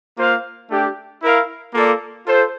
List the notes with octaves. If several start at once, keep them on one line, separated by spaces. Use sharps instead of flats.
A#3 F4 C5 F5
A3 D4 G4
E4 A#4 F5
A#3 F4 A4 D5
F4 A4 C5